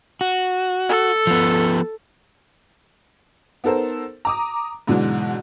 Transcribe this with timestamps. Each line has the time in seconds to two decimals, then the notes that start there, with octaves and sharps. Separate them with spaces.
0.21 F#4
0.89 A4
1.27 F3 B3
3.64 B3 D#4 A4 A#4 C5
4.25 A#5 D6 D#6
4.87 G#2 B2 D3 E3 F#3 G#3